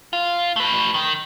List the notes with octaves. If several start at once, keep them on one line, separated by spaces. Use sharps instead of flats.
F4
A3 B4
D#3